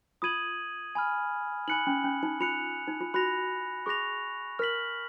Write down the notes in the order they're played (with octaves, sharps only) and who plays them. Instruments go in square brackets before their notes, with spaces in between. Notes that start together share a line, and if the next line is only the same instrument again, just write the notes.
[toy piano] F4 [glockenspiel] D#6 G#6 D#7 F#7
[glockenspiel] G#5 B5 F6
[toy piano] D#4 [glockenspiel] G#5 B5 F#6 C#7 F#7
[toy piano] C#4
C#4
D#4
[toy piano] F4 [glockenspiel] F#6 C#7 F7
[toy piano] D#4
F4
[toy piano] F#4 [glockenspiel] B5 F#6 A#6 F7
[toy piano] G#4 [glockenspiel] C#6 F#6 A#6 F7
[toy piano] A#4 [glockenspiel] F6 B6 F#7